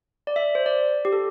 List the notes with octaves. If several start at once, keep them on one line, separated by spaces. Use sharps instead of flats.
D5
E5
C5
D5
G4
A4